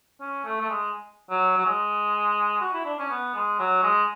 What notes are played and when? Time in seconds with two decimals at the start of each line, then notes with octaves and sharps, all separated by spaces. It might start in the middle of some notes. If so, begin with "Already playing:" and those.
0.20 C#4
0.44 A3
0.60 A3
0.69 G#3
1.30 F#3
1.57 F#3
1.65 G#3
2.60 F#4
2.73 E4
2.85 D4
2.98 C#4
3.10 B3
3.35 G#3
3.59 F#3
3.82 G#3